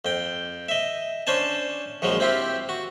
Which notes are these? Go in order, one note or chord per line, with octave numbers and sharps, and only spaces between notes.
F2 G5
D#5 E5
C#4 D4 C5 G#5 A5
A#1 F3 F#3 G#3
C4 E4 F4 G4
F#4